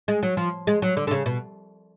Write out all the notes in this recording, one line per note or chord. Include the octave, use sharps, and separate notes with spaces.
G#3
F#3
F3
G#3
F#3
D3
D3
C#3
B2